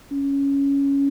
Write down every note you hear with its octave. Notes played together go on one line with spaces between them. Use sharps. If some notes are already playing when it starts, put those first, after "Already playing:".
C#4